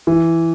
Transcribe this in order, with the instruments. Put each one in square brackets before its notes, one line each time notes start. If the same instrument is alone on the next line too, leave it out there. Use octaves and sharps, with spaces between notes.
[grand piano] E3